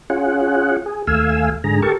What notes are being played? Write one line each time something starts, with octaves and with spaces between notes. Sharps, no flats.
C#4 F4 G#4 F#5
G#4
D#2 A3 F5 G#5 E6
G#2 D3 G#4 A#5
G4 A4 A#4 A5 C#6